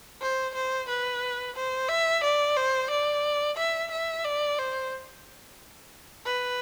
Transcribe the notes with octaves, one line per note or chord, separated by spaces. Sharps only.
C5
C5
B4
C5
E5
D5
C5
D5
E5
E5
D5
C5
B4